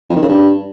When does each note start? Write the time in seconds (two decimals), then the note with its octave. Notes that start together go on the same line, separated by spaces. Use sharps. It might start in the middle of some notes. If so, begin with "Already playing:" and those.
0.10 F2
0.16 D#3
0.22 C#3
0.28 G2